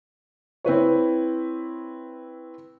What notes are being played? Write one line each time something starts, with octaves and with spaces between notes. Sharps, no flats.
C4 E4 B4 C#5